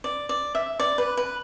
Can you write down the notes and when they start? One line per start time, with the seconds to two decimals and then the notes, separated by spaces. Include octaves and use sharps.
0.04 D5
0.29 D5
0.55 E5
0.80 D5
0.98 B4
1.17 B4